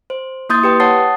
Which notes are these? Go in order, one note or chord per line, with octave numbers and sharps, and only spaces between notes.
C5
A#3 E4 C6 D#6 G6 A6
G4 B4 G5
C#5 F#5 A5 D#6 A6 C7